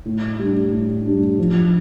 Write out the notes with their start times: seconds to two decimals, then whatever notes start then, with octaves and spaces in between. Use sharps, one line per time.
0.05 A2
0.39 G3 D4
0.72 A2
1.06 G3 D4
1.39 F3